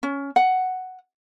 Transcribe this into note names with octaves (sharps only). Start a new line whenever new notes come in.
C#4
F#5